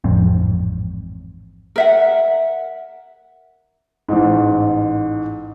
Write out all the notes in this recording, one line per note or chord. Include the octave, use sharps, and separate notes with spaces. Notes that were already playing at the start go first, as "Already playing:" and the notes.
A1 F2 G#2 C4
A#4 E5 F#5
A1 G#2